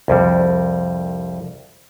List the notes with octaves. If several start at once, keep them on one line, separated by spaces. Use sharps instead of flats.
C2 F2 G3